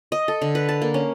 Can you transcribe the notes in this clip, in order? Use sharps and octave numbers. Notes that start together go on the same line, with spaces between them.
D#5
A4
D3
B4
A5
A#3
C#4